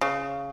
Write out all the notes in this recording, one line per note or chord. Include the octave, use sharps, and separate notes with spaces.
C#3